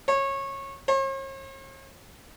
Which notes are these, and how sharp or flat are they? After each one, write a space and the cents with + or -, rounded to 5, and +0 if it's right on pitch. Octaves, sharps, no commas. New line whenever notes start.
C#5 -20
C#5 -45